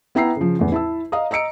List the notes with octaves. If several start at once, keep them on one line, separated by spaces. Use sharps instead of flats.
B3 E4 G5 A#5 E6 C7
C#3 F3
E2 A2
E4 A5 E6
D#5 F5 A#5 D#6
D#5 A#5 E6 C#7 D7